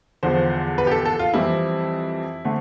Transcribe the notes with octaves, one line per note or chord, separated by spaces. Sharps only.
E2 D3 F3 C5
B4
G4
A4
A4
F4
F2 E3 G3 C4 E4
D3 A3 C4